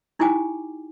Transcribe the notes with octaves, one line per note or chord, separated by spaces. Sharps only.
D#4 E4 G4 G5 G#5 D6